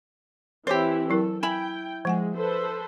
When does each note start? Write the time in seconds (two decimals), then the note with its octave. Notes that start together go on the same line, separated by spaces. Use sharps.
0.67 E3 C4 E4 G4 C5 C#5 D6
1.10 F#3 E4 A4 A#4
1.43 E4 G5 G#5 B5
2.05 F3 G#3 F#5 G#5
2.36 A4 B4 C5